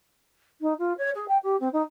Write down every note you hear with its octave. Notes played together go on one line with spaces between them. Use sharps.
D#4
F4
C#5
G#4
G5
G4
C4
D#4